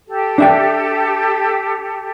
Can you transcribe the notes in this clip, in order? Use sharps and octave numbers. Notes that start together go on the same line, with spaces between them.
G4 A4
D4 E5 G5